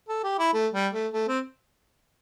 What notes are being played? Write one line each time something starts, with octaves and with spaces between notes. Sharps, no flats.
A4
G4
E4
A3
G3
A3
A3
C4